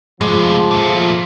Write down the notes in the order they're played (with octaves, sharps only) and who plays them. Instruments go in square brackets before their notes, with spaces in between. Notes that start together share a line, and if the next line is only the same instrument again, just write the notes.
[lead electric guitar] A2 C3 [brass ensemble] F3 [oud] G#3
[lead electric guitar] A#2 A3